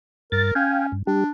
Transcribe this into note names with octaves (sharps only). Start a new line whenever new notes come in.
G2 A#4 A6
C#4 F5 G5 G#5
G2
G3 D4 G4